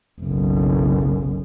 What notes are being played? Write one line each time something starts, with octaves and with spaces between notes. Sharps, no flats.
F#1 B1